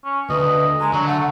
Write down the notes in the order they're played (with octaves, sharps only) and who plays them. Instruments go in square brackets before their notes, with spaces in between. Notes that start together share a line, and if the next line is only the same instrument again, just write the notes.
[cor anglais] C#4
[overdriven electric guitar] D2 [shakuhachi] B4 [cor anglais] D#5
[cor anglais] G#3 [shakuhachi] A#5
[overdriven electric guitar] D3 [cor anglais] F#3
[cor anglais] A3 [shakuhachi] F#5